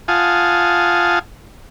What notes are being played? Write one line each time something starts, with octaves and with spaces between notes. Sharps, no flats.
F4 F5 F#5 G#5 A5 D#6